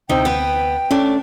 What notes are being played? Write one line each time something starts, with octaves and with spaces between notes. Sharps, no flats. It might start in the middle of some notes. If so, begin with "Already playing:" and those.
D2 C3 D#4 G5
B3 B4
A3 C#4 D4